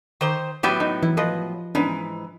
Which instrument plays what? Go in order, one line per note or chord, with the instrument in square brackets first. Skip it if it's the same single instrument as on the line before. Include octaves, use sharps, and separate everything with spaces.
[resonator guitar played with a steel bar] D#3 C5 [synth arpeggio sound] C#6 D6
[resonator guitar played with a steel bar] A2 F#3 B3 [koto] G4 E5
[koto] D#4
[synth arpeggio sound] E3 [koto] E4
[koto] F3 B4 D#5
[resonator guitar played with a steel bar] G#2 E3 [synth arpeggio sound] B3 C#4 D4